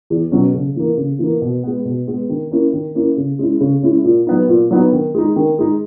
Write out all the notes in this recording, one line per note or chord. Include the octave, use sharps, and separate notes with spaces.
E2
B2 F#3 C#4
C#3
E3 A#3
C#3
E3 A#3
B2
G#3 B3
B2
G#3 B3
D#3
A#3 C#4 E4
D#3
A#3 C#4 E4
C#3
G#3 C#4 E4
C#3
G#3 C#4 E4
A#2
F#3 B3 D#4
A#2
F#3 B3 D#4
D#3
G#3 D#4
D#3
G#3 D#4